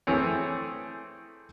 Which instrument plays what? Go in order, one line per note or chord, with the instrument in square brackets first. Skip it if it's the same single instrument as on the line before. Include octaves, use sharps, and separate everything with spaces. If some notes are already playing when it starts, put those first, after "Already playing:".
[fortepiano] E3 A3 C4 G#4 C#5